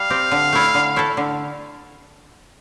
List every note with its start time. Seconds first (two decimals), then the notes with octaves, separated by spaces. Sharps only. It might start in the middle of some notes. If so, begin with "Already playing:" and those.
Already playing: G3 F5
0.10 C4 G4
0.31 D3
0.53 A3 E4 A4
0.74 D3
0.96 A3 E4 A4
1.17 D3